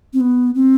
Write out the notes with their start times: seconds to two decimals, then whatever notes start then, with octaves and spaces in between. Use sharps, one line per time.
0.13 C4
0.20 B3
0.55 C4